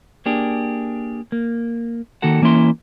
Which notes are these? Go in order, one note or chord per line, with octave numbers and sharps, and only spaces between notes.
A#3 D4 G4 G#4
A#3
D#3 A#3 F#4 A4 F#5
E3 A#3 C#4 E4 C6